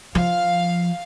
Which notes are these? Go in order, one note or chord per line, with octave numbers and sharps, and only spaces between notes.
F3 F5